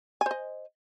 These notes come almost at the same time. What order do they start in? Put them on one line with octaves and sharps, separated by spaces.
G#5 C5 D#5